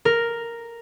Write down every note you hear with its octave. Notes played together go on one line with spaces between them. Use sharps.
A#4